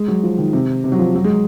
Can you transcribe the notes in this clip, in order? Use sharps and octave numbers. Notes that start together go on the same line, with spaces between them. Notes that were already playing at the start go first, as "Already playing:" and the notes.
Already playing: G#3
F#3
F3
D#3
C3
C3
F#3
F3
F#3
G#3